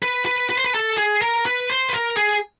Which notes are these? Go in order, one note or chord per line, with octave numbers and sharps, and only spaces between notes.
B4
B4
B4
C5
B4
A4
G#4
A#4
B4
C5
B4
A#4
G#4